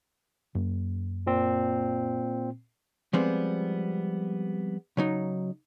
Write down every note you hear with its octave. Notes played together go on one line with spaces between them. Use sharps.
F#2 A#3
A#2 C4
F3 G3 G#3 B3 C4
C#3 F#3 D#4